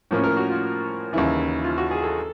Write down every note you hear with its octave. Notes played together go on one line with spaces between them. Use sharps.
A2 F3 A#3 C#4
A#4
F#4
F4
D#2 C#3 E3 E4
F4
F#4
G#4
A4